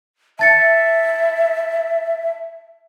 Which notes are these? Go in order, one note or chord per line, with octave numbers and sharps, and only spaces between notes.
E5 A5 A6 C#7